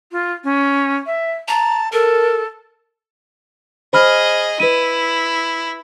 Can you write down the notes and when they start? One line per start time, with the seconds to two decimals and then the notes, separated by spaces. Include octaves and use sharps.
0.12 F4
0.44 C#4
1.06 E5
1.48 A5 A#5
1.92 A4 A#4
3.93 G#4 C5 D#5 B5 F6
4.60 E4 B4 D#7